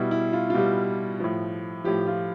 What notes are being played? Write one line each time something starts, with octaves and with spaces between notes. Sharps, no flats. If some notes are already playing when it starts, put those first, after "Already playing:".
Already playing: B2 G3 E4
E4
F4
F4
B2 G3 G4
A2 F3
A2 F3 G4
F4